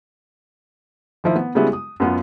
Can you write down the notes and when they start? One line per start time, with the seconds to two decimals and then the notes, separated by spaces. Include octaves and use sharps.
1.24 D#3 F3 E4
1.35 B3
1.55 C#3 G3 G#3 B3 E4 F#4
1.73 D#6
2.00 F#2 B3 F4